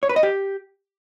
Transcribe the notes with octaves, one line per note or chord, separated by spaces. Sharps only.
C#5
B4
D#5
G4